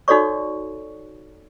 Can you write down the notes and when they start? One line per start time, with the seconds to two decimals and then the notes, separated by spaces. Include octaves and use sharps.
0.08 D#4 F#4 A4 C#5 D5 C#6